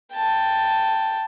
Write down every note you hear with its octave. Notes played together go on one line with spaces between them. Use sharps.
G5 A5